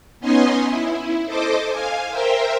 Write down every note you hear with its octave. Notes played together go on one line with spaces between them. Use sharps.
B3 C#4 D#4 D#5 G#5 C6
E4
A4 C5 D#5 D6
F5 G#5
A#4 C5 E5 G5